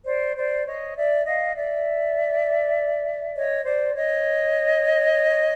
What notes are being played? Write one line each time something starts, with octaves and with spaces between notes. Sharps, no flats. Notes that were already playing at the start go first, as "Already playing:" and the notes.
C5 D5
C5 D5
C#5 D#5
D5 E5
D#5 F5
D5 E5
C#5 D#5
C5 D5
C#5 D#5